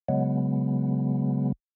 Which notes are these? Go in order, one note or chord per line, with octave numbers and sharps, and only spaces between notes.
C#3 F#3 G#3 B3